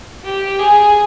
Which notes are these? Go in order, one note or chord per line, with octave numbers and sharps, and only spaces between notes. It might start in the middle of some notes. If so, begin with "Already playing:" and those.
G4
G#4